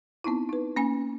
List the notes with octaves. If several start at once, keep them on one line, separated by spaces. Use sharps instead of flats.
B3 C4 D#4 E4
D#4 B4
A#3 C#4 G#5